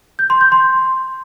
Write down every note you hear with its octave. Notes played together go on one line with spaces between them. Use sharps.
G6
C6
G6
C6